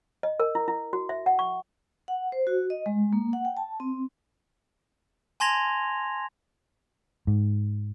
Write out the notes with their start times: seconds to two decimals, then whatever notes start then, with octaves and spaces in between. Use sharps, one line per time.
0.23 D#5
0.40 A#4
0.55 E4
0.68 E4
0.93 F#4
1.09 E5
1.26 F#5
1.39 C#6
2.08 F#5
2.32 C5
2.47 F#4
2.70 D#5
2.86 G#3
3.13 A#3
3.33 F#5
3.45 G5
3.57 A5
3.80 C4
5.40 G#5 A5 C6 G#6 A#6 F7
7.27 G#2